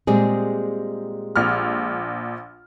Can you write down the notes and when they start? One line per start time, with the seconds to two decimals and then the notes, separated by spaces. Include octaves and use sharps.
0.07 A#2 G3 G#3 C4 G#4
1.36 A#1 F6